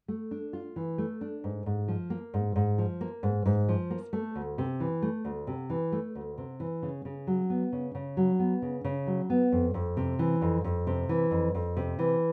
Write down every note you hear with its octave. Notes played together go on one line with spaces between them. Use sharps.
A3
D4
F4
E3
A3
D4
G#2
G#2
F3
A#3
G#2
G#2
F3
A#3
G#2
G#2
F3
A#3
A3
D2
C3
E3
A3
D2
C3
E3
A3
D2
C3
E3
C#3
C#3
F#3
B3
C#3
C#3
F#3
B3
C#3
C#3
F#3
B3
F2
F2
C3
E3
F2
F2
C3
E3
F2
F2
C3
E3